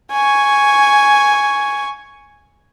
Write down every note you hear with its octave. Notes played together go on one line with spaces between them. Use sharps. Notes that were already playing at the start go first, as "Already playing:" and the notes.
G#5 C#6